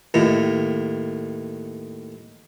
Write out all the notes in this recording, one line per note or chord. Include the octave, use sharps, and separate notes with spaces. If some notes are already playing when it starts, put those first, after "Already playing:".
D#2 A2